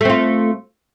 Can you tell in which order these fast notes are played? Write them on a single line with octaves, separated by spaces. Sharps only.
A3 C4 F4